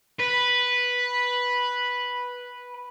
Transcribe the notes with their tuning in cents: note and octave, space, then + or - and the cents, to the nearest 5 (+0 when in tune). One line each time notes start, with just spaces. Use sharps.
B4 -5